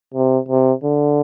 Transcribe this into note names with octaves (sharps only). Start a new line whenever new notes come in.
C3
C3
D3